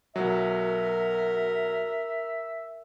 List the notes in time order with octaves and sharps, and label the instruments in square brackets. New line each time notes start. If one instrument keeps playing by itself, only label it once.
[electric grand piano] B1 F#3 [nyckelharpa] A#4 [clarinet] E5